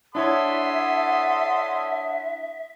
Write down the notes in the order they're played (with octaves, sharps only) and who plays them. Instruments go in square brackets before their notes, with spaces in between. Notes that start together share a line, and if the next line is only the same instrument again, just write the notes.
[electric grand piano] D4 E4 C#5 [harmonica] A4 C6 D#6 [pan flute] E5 [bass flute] F#5